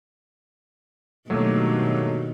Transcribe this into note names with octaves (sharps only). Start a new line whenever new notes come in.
G2 B2 D#3 F#3 A3 A#3